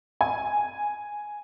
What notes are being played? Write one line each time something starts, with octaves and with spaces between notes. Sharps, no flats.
G#5